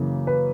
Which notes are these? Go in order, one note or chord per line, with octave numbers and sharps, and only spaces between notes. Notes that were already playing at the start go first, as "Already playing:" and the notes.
Already playing: F#2 C#3 E3 A#3
B4